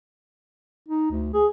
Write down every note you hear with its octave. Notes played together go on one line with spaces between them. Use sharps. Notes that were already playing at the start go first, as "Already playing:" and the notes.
D#4
D2
G#4